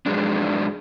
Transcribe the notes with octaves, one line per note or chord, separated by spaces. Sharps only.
F2 G#2 F#3 G#3 D4